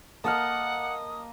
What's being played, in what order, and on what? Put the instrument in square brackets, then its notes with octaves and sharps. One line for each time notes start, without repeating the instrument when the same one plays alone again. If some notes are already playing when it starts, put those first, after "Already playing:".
[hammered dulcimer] A#3 D#5 [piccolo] F#5 [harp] A5 F6 [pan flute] D#6